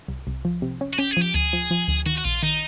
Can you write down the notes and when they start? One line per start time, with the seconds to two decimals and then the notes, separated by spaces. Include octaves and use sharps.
0.08 C2
0.27 C2
0.45 F3
0.62 C3
0.81 C#4
0.93 F#4
0.98 C#4 G4
1.11 G#4
1.17 F3
1.22 G4
1.34 D2 G#4
1.53 F3
1.71 F3
1.88 D2
2.06 D#3 F#4
2.18 F#4
2.24 A#1 F4
2.42 D#3 D#4